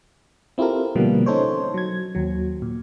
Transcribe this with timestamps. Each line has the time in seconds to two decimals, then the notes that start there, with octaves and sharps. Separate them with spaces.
0.58 C4 E4 F4 G4 A4 A#4
0.95 B2 D3 F3 G3 A#3 B3
1.26 C#4 D#4 A4 C5 C#5
1.74 F#3 G#6
2.15 D#2 F#3
2.62 A#2